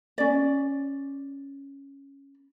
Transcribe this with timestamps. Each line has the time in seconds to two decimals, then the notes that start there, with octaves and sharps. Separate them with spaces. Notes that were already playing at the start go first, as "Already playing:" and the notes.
0.18 C#4 D5